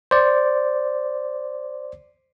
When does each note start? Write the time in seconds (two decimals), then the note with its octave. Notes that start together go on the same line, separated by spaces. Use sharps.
0.11 C5 D5